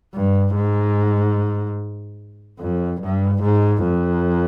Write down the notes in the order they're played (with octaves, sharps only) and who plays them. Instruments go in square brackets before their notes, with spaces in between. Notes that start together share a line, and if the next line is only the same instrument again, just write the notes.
[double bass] G2
G#2
F2
G2
G#2
F2